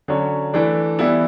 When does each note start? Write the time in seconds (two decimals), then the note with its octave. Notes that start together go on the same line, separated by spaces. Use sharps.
0.08 D3 F#3 C#4
0.53 E3 A3 D4
0.99 E3 G3 B3 E4